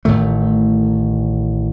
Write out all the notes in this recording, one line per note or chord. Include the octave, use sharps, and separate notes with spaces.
A1 A2 D#3 A3